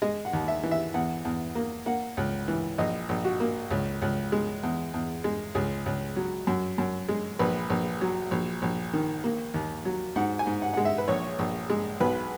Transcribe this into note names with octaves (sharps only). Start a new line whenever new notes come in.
G#3 D#5
F#5
D#2
E5
E3
E5
E2 F#5
E2
A#3
A#3 F#5
C#2
E3
A#1 D#5
A#1
F#4
A#3
C#2
C#2
G#3
E2
E2
G#3
C#2 G#4
C#2
F#3
F#2
F#2
G#3
A#1 B4
A#1
F#3
A#1
A#1
D#3
A#3
D#2
F#3
G#2 F#5
G#5
G#2
F#5
G#3 F#5
E5
B4
A#1 C#5
A#1
G#3
B1 B4